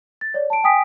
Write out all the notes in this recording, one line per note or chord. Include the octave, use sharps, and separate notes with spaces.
A6
C#5 D5
A5 D7
G5 G#5 D#6 B6 D7